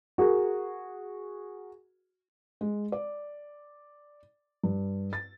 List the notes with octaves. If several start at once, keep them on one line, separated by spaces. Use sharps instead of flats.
F#4 G#4 A#4
G#3
D5
G2
A6